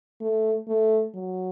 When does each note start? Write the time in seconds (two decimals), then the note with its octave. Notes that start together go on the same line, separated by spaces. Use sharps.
0.21 A3
0.68 A3
1.15 F#3